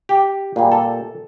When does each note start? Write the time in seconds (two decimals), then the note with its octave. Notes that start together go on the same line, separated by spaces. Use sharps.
0.09 G4
0.56 A#2 G3 G#4
0.72 A4